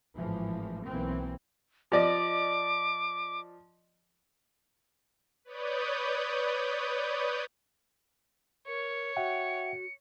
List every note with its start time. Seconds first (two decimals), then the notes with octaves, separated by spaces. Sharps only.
0.16 G#1 A2 E3 F3
0.85 B1 E3 A#3 C4
1.92 F3 D5 D#5 D6
5.45 B4 C#5 D5 D#6 G6
8.68 A#4 C#5 C#7
9.17 F#4 E5 F#5 G5